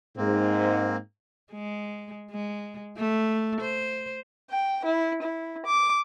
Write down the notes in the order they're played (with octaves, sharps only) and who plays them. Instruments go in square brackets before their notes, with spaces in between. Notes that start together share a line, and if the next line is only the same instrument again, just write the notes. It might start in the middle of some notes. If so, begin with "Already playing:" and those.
[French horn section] G#2 [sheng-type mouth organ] A#3 C4
[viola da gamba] G#3
G#3
A3
C5
[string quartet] G5
E4
E4
D6